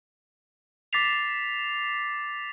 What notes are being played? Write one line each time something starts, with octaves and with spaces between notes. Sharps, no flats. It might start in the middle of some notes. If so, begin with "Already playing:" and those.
D6 A6 B6 C7 F7